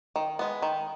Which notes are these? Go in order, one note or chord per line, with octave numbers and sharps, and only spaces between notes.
D#3
G#3 B3
D#3